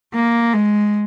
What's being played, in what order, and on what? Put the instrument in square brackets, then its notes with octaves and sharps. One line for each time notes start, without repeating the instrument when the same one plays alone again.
[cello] A#3
G#3